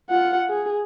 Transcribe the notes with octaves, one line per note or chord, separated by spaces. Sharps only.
F4 F#5
G#4